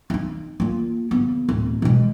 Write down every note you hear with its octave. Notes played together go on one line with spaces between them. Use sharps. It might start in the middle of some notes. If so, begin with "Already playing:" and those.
D#4 F4
A#3 F4
C#3 B3
D1
B2 G#3